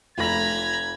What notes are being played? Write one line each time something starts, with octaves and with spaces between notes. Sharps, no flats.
F1 A#5 B5 G#6 A#6